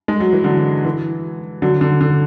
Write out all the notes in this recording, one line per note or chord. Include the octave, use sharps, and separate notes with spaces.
G#3
F#3
E3
D3 F#3
E3
D3 F#3
D3
D3